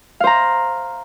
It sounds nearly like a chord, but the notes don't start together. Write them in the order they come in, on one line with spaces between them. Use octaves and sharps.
F5 C5 A#5